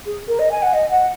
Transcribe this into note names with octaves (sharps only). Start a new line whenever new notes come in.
G#4
A#4
D#5
G#5
F#5
D#5
F#5